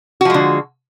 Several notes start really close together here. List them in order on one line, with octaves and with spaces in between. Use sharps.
F#4 F3 G#3 D3